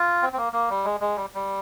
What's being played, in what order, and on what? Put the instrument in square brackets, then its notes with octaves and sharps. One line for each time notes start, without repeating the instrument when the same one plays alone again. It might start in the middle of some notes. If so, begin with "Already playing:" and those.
Already playing: [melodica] F4
C4
C4
A#3
A#3
G3
G#3
G#3
G3
G3